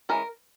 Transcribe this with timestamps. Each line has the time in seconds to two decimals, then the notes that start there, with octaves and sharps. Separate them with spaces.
0.09 E3 G#3 C#4 A#4